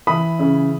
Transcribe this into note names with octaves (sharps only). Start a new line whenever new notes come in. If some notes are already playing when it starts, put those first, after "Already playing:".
E3 B5 D#6
C#3